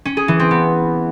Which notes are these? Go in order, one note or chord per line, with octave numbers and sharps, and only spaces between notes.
C#4
G#4
E3
C4
B3